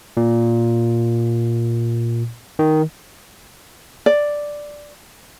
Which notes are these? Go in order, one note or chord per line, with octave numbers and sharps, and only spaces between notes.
A#2
D#3
D5